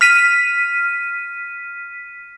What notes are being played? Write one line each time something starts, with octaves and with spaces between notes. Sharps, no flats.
F6 B6 D#7